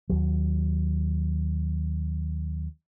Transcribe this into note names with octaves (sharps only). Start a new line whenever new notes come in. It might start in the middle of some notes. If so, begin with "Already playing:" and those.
D#2 F#3